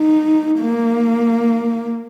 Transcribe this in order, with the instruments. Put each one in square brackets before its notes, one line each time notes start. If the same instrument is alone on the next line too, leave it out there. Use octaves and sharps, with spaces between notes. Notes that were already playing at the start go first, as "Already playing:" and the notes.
Already playing: [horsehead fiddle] D#4
A#3